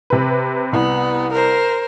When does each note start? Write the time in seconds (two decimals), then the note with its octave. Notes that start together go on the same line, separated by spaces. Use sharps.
0.10 C3 B4
0.73 C2 B3
1.33 A#4 C5